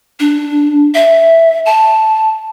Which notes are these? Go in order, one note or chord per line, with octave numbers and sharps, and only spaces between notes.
D4
E5
A5